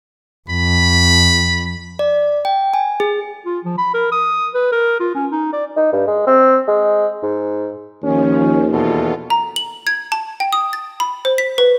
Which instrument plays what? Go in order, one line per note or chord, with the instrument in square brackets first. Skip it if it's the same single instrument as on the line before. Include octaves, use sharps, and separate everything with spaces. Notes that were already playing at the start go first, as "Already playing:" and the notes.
[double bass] F2 [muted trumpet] B5
[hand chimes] D5
G5
G#5
G#4
[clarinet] F4
F3
B5
A#4
D#6
B4
A#4
F4
C#4
D#4
D5
[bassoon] D#4
G2
G#3
C4
G#3
G#2
[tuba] D#2 [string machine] D#3 F3 [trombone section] C#4
[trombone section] E2 B2 A4 [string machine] F4
[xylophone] A#5
F#7
G#6
A5
G5
D#6
A6
B5
C5
B6
B4